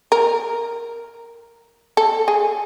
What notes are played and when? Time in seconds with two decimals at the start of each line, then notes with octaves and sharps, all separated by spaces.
0.12 A#4
1.97 A4
2.28 G#4